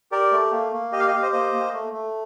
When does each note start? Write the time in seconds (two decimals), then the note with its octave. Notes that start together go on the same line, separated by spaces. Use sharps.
0.12 G4 A#4 D5
0.32 A3
0.52 A#3
0.72 A#3
0.92 G4 D#5
1.00 F5
1.08 D#5
1.13 G4 F5
1.23 C5 D#5
1.33 A#3 C5 D#5
1.53 A#3
1.73 A3
1.93 A3